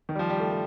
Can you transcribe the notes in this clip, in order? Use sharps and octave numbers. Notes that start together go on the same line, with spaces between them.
D#3
G3
F3
G3
A3
A3